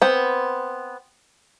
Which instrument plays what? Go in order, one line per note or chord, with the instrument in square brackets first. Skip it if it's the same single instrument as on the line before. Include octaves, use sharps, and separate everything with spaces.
[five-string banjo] B3 C4